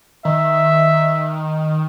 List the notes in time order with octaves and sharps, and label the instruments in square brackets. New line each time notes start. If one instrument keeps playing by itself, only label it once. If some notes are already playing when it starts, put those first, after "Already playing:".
[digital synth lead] D#3 [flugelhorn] E5